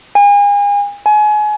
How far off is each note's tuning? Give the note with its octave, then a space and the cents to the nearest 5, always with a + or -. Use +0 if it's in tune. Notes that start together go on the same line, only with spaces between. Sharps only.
G#5 -35
G#5 +30